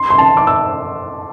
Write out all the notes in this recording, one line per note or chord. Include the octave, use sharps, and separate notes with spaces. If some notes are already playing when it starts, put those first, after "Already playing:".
Already playing: C6
C6
A5
D6
E6